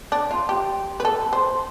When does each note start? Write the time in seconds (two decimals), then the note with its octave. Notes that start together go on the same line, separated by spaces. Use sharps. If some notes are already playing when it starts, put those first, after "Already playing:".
0.12 D4
0.31 F4
0.49 G4
1.00 B4
1.05 A4
1.33 C5